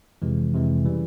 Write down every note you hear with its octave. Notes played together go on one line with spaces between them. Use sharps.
F2 C3 E3 G#3
F2 C3 E3 G#3
C#3 E3 G3